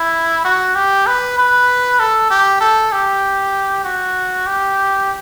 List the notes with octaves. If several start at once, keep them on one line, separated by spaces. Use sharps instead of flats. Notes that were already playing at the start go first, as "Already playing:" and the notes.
Already playing: E4
F#4
G4
B4
B4
A4
G4
A4
G4
F#4
G4